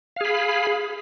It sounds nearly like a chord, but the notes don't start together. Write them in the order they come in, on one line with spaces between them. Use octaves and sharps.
F5 G#4 B5